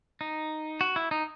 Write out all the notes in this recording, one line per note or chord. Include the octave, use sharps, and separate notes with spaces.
D#4
F#4
E4
D#4